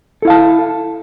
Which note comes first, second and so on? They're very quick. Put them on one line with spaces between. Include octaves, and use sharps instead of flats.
A4 E4 F5 A5